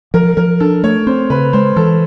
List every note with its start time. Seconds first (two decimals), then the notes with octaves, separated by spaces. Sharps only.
0.14 F3 A#4
0.37 F3 A#4
0.60 D4 A4
0.83 A3 C#5
1.07 C4 C5
1.30 C#3 B4
1.53 G#3 C5
1.76 E3 A4